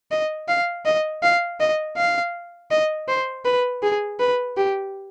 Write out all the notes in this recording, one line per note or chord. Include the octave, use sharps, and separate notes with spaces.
D#5
F5
D#5
F5
D#5
F5
D#5
C5
B4
G#4
B4
G4